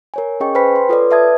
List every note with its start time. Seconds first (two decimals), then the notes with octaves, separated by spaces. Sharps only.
0.14 A#4 C#5 G#5
0.40 C#4 G#4 D#5 G5 C#6
0.55 B4 C5 G5 G#5 B5 B6
0.76 C6
0.89 F4 A4 B4 C#5 D5
1.11 B4 D5 E5 A5 D#6 G#6